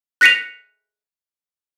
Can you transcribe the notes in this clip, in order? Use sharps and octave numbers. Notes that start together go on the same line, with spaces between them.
F#6 A#6 B6 C#7 D#7 F7